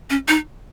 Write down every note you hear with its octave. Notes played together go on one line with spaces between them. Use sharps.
C#4
D#4